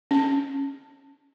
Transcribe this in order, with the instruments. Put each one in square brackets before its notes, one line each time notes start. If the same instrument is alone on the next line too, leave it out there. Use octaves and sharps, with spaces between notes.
[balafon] C#4